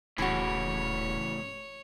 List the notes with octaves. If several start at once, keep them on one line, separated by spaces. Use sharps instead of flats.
D#1 A2 C#3 E3 F#4 C#5